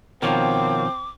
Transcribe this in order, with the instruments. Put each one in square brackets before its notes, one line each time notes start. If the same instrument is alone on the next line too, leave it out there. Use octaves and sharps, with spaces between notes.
[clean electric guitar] B2 D#3 F3 [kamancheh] C4 [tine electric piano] A#4 C#5 F5 [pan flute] D6